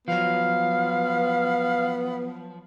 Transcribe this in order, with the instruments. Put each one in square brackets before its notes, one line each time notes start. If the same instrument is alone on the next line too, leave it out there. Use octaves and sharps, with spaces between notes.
[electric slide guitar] F3 F#3 [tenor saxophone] B3 [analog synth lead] F5